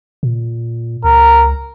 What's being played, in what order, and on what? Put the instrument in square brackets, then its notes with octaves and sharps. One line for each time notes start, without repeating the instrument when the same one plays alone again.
[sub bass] A#2
[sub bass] C#2 [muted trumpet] A#4